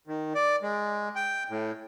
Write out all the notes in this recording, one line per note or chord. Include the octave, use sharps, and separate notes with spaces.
D#3
D5
G#3
G5
A2